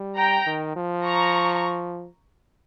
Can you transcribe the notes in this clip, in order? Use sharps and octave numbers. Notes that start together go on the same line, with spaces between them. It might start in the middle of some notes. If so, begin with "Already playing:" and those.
Already playing: G3
G5 A#5
D#3
F3
A#5 C#6